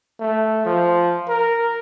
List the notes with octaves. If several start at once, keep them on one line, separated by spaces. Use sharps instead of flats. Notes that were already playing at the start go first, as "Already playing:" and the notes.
A3
F3
A#4